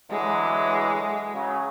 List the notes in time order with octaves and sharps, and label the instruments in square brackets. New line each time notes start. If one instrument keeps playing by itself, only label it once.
[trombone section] D3 E3 F#3 [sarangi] G#3
[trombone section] C#3 F#3